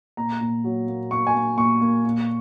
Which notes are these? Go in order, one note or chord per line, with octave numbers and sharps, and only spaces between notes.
A#2 A#5
A#2
F#3
A#3
A#3 C#6
G#5
A#3
A#2 C#6
A#3
A#2